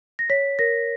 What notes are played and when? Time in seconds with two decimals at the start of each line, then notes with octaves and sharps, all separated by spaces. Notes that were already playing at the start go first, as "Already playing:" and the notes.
0.19 A#6
0.30 C#5 B6
0.59 A#4 A#6